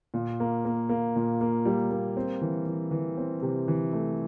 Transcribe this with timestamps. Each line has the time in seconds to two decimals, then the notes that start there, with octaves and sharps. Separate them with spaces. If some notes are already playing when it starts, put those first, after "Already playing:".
0.14 A#2
0.40 A#3
0.65 A#3
0.89 A#3
1.16 A#2
1.41 A#3
1.65 G3
1.91 A#3
2.17 C4
2.41 E3
2.66 E3
2.91 E3
3.18 C4
3.42 C3
3.68 E3
3.93 A3